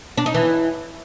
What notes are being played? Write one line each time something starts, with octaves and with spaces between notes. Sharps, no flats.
D4
D#4
E3